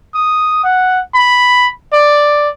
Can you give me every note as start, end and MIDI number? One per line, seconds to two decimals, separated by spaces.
0.15 0.63 87
0.64 1.01 78
1.15 1.69 83
1.93 2.49 74